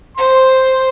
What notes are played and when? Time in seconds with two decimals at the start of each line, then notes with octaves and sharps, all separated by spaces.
0.17 C5 C6